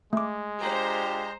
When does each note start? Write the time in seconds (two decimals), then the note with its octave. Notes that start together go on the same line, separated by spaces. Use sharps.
0.13 G#3 A3 D6
0.61 D4 F4 G4 C5 A#5